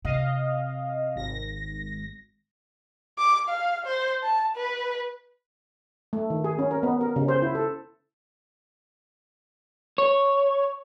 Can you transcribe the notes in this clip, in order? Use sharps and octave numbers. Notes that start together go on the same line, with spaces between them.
C3 D#5 F5
G#1 A#6
D6
F5
C5
A5
B4
A3
D#3
G#4
C#4
A#4
B3
A#4
C#3
C5
E4
A4
C#5